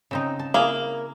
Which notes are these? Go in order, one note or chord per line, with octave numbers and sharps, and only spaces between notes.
C#3 C4 D#4
A5
A#3 E4 G#4 E5